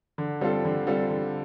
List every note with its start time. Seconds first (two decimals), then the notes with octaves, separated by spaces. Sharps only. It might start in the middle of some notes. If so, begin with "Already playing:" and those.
0.18 D3
0.41 G3 C4 F4 A4
0.65 D3
0.87 G3 C4 F4 A4
1.10 D3